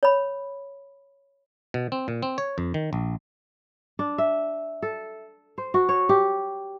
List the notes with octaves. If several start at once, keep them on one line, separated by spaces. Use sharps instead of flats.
C#5 B5
B2
C4
A#2
C4
C#5
F2
D#3
A#1
D4
E5
A4
C5
F#4
C#5
G4